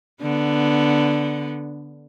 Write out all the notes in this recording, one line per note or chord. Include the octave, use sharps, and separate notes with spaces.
D3 B3